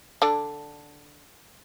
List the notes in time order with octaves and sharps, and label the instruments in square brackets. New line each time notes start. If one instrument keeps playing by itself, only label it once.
[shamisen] D3 D4